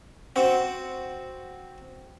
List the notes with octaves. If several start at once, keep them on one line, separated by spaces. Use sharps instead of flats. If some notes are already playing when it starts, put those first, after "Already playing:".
C4 F#4